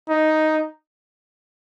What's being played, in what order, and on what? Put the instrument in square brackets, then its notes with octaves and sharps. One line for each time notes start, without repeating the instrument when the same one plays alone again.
[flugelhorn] D#4